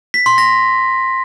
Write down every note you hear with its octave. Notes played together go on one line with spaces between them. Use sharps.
B6
C6
A#6